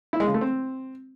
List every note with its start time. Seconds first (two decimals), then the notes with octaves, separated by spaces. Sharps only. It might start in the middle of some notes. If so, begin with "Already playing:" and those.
0.13 E4
0.20 G#3
0.27 C#3
0.34 A3
0.41 C4